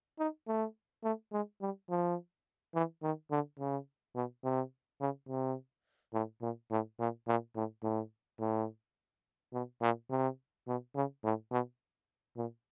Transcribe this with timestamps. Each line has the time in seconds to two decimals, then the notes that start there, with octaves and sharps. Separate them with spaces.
0.19 D#4
0.47 A3
1.04 A3
1.32 G#3
1.61 G3
1.90 F3
2.75 E3
3.03 D#3
3.31 D3
3.60 C#3
4.15 B2
4.44 C3
5.00 C#3
5.28 C3
6.14 A2
6.42 A#2
6.71 A2
6.99 A#2
7.27 A#2
7.55 A2
7.83 A2
8.40 A2
9.53 B2
9.82 A#2
10.10 C3
10.67 B2
10.95 C#3
11.24 A2
11.51 B2
12.37 A#2